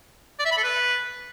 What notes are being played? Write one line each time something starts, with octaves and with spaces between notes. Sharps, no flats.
D5
E5
B5
A4
B4